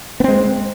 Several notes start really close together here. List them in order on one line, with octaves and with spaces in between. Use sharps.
B3 C4 G#3